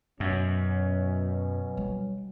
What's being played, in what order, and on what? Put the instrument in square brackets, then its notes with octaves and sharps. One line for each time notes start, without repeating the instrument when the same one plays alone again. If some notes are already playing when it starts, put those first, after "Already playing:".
[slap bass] F#2 [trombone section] B2 F#3 C#4
[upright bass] G3